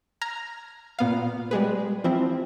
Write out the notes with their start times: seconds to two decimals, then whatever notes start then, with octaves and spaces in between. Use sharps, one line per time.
0.21 A#5 F6 G#6 A#6
0.99 A#2 B3 F5
1.51 G3 G#3 G#4 B4
2.04 E3 F3 C4 E4